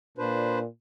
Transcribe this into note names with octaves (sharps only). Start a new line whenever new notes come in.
A#2 D4 B4 C5